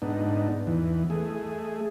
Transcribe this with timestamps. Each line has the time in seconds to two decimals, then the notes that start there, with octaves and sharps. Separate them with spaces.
0.02 G#2 B3 D4 D#4
0.67 E2 E3
1.10 A3 G#4